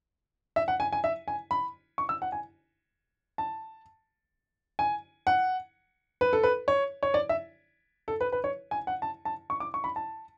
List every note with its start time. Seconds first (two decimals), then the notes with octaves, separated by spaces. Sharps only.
0.56 E5
0.68 F#5
0.80 G#5
0.93 G#5
1.04 E5
1.28 G#5
1.51 B5
1.98 C#6
2.09 E6
2.22 F#5
2.32 G#5
3.38 A5
4.79 G#5
5.27 F#5
6.21 B4
6.33 A4
6.43 B4
6.68 C#5
7.03 C#5
7.14 D5
7.29 E5
8.08 A4
8.21 B4
8.32 B4
8.44 C#5
8.71 G#5
8.87 F#5
9.02 A5
9.25 A5
9.50 C#6
9.60 D6
9.74 C#6
9.84 B5
9.96 A5